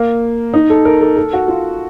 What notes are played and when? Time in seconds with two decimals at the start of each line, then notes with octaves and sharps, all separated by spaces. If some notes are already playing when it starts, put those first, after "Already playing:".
Already playing: A#3
0.54 D#4
0.70 A4
0.85 A#4
1.01 A4
1.17 A4
1.33 F#4
1.48 F4